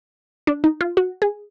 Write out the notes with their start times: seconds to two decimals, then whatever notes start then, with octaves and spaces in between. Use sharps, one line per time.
0.47 D4
0.64 D#4
0.81 F4
0.97 F#4
1.22 G#4